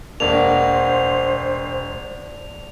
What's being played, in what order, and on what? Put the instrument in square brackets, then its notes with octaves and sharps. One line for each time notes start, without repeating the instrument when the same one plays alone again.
[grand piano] E1 A#3 [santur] D4 F#5 [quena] C5 [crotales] F7